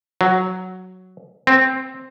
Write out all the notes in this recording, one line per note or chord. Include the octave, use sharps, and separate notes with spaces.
F#3
C4